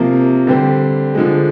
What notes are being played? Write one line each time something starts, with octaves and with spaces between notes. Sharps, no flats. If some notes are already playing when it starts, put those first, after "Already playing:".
Already playing: C3 F3 A#3
D3 G3 C4 G4 C5
D3 F3 G#3